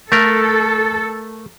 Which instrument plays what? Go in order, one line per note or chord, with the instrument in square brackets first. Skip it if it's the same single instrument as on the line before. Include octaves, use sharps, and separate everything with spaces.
[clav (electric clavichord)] A3 A#4 [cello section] A4